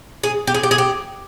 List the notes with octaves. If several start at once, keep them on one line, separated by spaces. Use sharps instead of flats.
G#4
G4
G#4
G4
G#4
G4